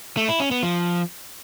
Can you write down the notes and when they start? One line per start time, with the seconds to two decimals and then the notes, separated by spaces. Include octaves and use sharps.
0.17 A3
0.29 E4
0.40 C#4
0.51 B3
0.63 F3